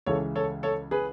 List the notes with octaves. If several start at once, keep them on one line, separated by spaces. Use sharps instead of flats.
C#2 C#3 E3 A4 C#5
A4 C#5
A4 C#5
G#4 B4